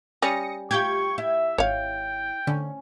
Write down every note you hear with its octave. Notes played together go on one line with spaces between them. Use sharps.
G3 C#4 D#6 A#6 C#7
F4 G4 G5 C#6 G6 G#6
E4 E5
G#1 C#5 F5 G5
D3 C#4